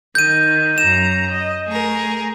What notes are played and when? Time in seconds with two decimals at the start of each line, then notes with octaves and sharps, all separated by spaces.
0.15 D#3 G6 D#7
0.78 F#2 A#5 E7
1.30 D#5
1.67 A3 G#4 A#4